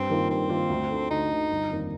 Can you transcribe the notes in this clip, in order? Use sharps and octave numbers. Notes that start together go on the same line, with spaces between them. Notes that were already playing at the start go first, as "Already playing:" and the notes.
Already playing: G2 C4
D#3 A#3 F4
G2 C4
D#3 A#3 F4
D2
D3 A3
D2 D#4
D3 A3
G1
F2 D#3 A#3 D4